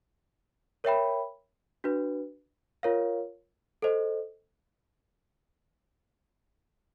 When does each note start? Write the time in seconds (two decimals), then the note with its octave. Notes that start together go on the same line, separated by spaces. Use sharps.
0.84 A#4 C#5 E5 G5 B5
1.84 D4 F#4 B4
2.83 F4 A#4 C#5 F5
3.82 A4 C5 D#5